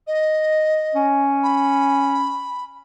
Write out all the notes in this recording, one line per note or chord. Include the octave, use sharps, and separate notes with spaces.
D#5
C#4
B5